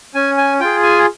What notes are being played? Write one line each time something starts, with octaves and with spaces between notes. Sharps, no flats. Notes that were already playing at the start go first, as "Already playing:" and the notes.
C#4 G#5
G#5
F4 G#4 G5
G#5